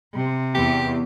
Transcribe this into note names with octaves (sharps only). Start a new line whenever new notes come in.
C3
E2 G4